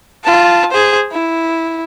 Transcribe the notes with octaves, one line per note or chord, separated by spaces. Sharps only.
F4 A5
G#4 C5
E4